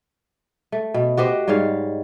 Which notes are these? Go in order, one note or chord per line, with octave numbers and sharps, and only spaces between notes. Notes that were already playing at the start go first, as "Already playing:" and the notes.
A3
B2
F#4 G4 C5 D#5
G#2 G3 C#5 F5